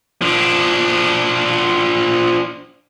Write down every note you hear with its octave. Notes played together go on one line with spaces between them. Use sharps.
F3 D4